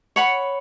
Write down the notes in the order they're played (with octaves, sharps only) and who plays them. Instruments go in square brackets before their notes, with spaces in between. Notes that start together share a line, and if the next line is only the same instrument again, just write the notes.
[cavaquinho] C#5 F#5 B5